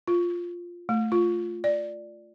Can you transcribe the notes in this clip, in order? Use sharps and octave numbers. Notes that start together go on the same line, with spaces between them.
F4
A3
F4
D5